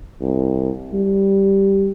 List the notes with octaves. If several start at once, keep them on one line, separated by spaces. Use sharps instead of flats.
C2
G3